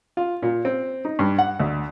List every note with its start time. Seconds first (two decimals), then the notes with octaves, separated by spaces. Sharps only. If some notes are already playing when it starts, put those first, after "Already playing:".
0.17 F4
0.42 A#2
0.65 C4
1.05 D#4
1.19 G2
1.38 F#5
1.60 D2